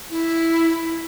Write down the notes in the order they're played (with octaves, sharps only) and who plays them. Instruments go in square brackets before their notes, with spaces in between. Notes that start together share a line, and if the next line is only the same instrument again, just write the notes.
[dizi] E4